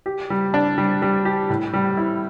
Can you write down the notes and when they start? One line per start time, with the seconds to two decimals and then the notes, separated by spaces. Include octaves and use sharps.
0.06 G4
0.30 G3
0.54 D4
0.78 G3
1.02 G3
1.25 G4
1.50 A2
1.74 G3
1.97 E4